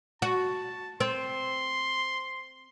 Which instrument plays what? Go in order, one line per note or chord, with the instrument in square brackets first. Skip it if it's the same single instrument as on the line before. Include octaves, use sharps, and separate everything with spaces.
[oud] F#4 [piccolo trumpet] A5
[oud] C4 [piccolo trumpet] C6